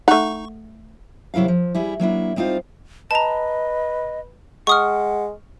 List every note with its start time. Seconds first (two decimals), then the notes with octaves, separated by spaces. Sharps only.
0.08 A3 D#4 F#5 C#6
1.34 C3 F#3 E4 A#4 F5
1.48 F3
1.75 G3 E4 G#4
2.00 F#3 A#3 D4 E4
2.36 G3 C4 D#4 F4 F5
3.11 B4 D#5 A5 A#5
4.67 G#3 F#5 C#6 D#6 F6